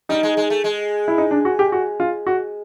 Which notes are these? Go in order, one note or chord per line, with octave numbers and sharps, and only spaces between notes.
G3 D#4
G#3
G#3
A3
G#3
E4
D#4
D4
F#4
G4
F#4
F4
F#4